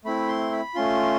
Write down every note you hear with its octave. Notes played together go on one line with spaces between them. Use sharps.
A3 C4 E4 B5
C6
B5
A3 C#4 F4 C6